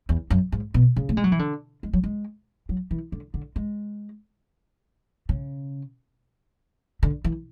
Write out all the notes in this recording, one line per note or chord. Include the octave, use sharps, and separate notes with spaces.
E2
F#2
G#2
B2
C#3
A3
G#3
F#3
E3
D3
G#3
F#3
G#3
F#3
E3
D3
D3
G#3
C#3
D3
E3